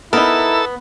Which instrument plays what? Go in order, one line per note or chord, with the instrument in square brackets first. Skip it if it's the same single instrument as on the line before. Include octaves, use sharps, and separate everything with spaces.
[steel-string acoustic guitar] B3 [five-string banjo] D#4 A#4 [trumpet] E4 [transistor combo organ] A4 E6